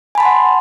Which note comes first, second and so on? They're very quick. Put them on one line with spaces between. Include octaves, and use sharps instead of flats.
G#5 B5 A5 C6 F#5